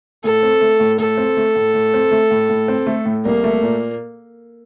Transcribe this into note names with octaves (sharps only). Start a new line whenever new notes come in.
A2 A4
C4
A3
A2
A2 A4
C4
A3
A2
A2
C4
A3
A2
A2
C4
A3
A2
C2 A#3
A3
A#2